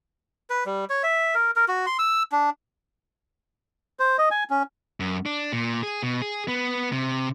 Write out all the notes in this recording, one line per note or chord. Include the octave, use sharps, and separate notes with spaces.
B4
G3
C#5
E5
A#4
A#4
F#4
C6
E6
D4
C5
D#5
G#5
C#4
F#2
D4
A#2
G#4
B2
G#4
B3
C3